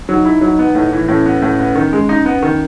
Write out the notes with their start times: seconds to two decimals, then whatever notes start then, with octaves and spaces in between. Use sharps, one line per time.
0.08 F#3 D#4
0.25 E4
0.41 F#3
0.59 B3
0.75 A2
0.93 E3
1.08 A2 C#4
1.25 B3
1.42 A2
1.59 B3
1.75 D#3
1.93 G#3
2.09 D#4
2.25 B3
2.42 D#3